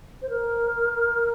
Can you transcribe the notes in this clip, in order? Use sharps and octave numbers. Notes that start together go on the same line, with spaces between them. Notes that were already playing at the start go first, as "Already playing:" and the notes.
C5
A#4